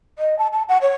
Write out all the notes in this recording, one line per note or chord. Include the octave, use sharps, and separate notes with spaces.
D#5
A5
A5
F#5
C#5